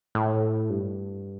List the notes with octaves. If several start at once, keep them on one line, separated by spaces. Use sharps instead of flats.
A2
G2